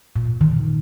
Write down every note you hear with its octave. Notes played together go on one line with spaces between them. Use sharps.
A#2
D#3